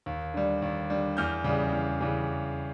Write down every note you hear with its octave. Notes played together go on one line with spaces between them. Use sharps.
D#2
D3 G3
D#2
D3 G3
E2 F6 G6
C#3 E3 G3
E2
C#3 E3 G3